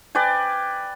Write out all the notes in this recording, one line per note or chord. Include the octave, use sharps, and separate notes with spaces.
B4 D5 G5 G#5